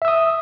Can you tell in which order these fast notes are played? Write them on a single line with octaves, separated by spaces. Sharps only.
E5 E6 D#6